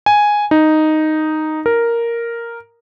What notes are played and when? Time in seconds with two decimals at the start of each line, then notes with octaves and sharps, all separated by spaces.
0.06 G#5
0.51 D#4
1.66 A#4